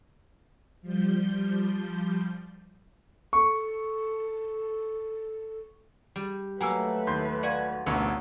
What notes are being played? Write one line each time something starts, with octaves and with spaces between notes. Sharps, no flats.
F3 G3 G6
A4 C#6
G3
F#3 A3 A#3 B4 G5 G#5 E6
D#2 C6 G6
F#4 D5 F5 F#5 G#5
A1 D2 B2 B3 D#4 A#4 C#5